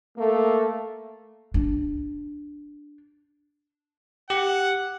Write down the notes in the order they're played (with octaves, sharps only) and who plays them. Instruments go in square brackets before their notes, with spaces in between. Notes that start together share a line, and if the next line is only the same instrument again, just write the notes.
[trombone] A3 [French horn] A#3
[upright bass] D4
[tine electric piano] G4 [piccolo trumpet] F#5